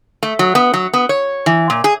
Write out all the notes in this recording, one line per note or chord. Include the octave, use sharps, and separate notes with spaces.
A3
F#3
B3
F#3
B3
C#5
E3
A#2
G#4